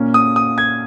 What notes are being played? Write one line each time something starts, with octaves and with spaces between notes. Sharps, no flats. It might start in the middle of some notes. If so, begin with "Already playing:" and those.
Already playing: A#2 A#3 C#4
D#6
D#6
G#6